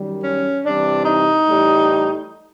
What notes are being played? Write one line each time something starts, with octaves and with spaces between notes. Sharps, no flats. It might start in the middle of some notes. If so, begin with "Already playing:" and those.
Already playing: F#2 D#3 G3
C#4
C3 E3 G3 D4
D#4
A2 E3 G3